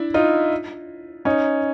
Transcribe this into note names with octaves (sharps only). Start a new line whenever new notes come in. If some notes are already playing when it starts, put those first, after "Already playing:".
Already playing: D4 E4
D#4 F4
C#4 D#4